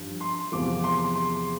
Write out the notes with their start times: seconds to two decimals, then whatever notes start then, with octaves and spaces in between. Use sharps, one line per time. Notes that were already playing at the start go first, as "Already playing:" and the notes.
Already playing: G2 F3
0.21 C6
0.52 E2 C3 F3 D6
0.84 C6
1.15 C6